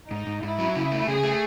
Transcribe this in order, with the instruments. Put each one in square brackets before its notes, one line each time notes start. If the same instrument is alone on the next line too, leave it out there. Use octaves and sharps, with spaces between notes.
[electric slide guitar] G#2 [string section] D#4
[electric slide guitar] G#2
[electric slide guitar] G#2 [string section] E4
[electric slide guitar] F#3
C#3
A3
[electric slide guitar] C#3 [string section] G#4
[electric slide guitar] A3